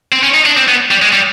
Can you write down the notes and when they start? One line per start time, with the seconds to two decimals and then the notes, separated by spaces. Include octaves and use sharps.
0.12 C4
0.23 C#4
0.34 D#4
0.46 D4
0.57 C4
0.68 B3
0.91 G3
1.02 G#3
1.13 G3